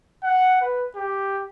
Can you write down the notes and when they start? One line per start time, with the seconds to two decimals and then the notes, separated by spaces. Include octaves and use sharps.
0.24 F#5
0.61 B4
0.96 G4